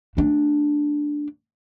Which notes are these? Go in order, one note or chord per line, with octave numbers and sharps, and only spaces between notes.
A3 D4